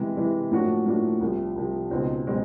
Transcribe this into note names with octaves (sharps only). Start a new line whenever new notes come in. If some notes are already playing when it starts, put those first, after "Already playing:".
Already playing: C3 E3 G#3
C3 E3 G#3
A2 F3 A#3 D4 F#4
A2 F3 A#3 D4 F#4
C2 C3 F3
C2 C3 F3
C#2 B2 G#3 C4 D#4
B2 G#3 C4 D#4